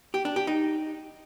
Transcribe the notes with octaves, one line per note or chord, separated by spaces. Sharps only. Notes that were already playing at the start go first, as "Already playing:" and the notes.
G4
D4
G4
D#4